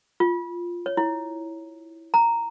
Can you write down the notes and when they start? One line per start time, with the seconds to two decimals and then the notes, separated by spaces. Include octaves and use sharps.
0.20 F4
0.86 C#5
0.97 E4
2.14 A#5